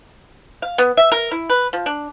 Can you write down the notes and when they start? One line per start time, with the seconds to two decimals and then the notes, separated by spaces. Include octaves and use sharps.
0.62 F5
0.78 B3
0.97 E5
1.12 A#4
1.31 E4
1.50 B4
1.73 F3
1.86 D4